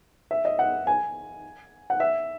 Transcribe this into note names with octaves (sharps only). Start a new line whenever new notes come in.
E5
D#5
F#5
G#5
F#5
E5